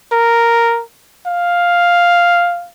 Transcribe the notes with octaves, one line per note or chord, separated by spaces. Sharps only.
A#4
F5